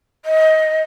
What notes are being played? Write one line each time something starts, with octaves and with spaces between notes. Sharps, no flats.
D#5